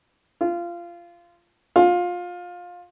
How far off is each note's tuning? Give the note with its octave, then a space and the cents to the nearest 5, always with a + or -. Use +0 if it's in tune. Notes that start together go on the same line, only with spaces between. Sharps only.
F4 -20
F4 +20